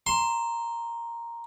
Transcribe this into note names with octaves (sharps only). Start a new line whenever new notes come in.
A#5 C6